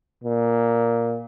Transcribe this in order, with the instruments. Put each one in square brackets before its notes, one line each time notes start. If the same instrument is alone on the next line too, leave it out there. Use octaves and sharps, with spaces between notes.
[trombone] A#2